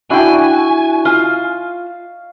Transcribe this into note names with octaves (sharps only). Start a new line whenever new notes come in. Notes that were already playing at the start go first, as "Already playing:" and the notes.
D4 E4 F#4 G5 G#5
F4 F5